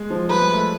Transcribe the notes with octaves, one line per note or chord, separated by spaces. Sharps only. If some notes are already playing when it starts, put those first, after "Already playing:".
Already playing: G#3
F3
G3 B4
G#3
A3